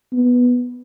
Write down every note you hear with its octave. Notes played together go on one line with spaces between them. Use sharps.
B3